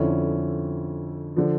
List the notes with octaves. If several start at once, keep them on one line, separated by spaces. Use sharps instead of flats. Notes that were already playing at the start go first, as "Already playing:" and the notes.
Already playing: F2 D3 F3 C#4 E4
D3 F3